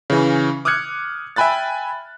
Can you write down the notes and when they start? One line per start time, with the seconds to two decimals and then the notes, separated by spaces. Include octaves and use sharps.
0.10 C#3 E3 C#4
0.65 D6 D#6 F6 F#6 G#6 C#7
1.36 E5 G5 G#5 B5 F#6 A6